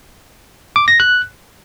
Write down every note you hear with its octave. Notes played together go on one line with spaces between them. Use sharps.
D6
A#6
F#6